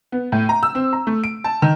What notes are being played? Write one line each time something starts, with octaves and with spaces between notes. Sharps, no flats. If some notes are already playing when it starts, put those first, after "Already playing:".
B3
A2
A#5
E6
C4
A#5
A3
D7
A5
D#3